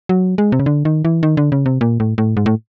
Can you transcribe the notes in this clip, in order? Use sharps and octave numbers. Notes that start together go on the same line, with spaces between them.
F#3
G#3
C3
C#3
D3
D#3
E3
D#3
D3
C#3
C3
A#2
A2
A2
G#2
A2